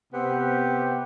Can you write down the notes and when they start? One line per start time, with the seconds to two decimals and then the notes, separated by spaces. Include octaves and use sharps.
0.13 C3 B3 C4 G4